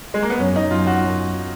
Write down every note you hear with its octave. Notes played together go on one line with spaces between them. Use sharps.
G#3
A#3
B3
F#2 C#4
D#4
F#2 F4
F#4